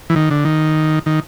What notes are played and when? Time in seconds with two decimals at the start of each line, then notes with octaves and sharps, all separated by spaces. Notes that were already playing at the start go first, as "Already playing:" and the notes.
0.10 E3
0.16 D#3
0.31 D3
0.45 D#3
1.06 D#3